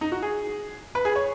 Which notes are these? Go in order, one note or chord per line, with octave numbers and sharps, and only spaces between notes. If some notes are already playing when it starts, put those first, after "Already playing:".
D#4
F#4
G#4
B4
G#4
C#5